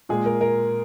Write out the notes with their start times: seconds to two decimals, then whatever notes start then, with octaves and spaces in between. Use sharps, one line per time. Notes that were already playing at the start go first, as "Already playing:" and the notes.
0.09 A#2 G#3 G#4
0.26 A#4
0.41 A#4